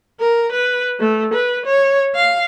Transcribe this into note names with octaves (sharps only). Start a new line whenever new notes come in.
A#4
B4
A3
B4
C#5
F5